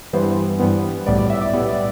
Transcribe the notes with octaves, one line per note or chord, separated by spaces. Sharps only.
G2 E3 G3 B3 C5
G2 E3 G3 B3
B1 A2 G3 B3 D5
D5
E5
D5
B1 A2 G3 B3 D5
D5